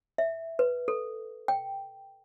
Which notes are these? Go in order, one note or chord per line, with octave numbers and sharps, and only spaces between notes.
E5
B4
A4
G5